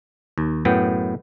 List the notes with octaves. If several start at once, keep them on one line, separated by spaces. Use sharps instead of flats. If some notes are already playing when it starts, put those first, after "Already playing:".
D#2
F#2 A2 B3 G5